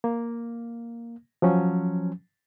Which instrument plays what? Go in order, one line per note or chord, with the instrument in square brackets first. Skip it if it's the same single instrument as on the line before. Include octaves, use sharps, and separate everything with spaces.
[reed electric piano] A#3
F3 F#3 C#4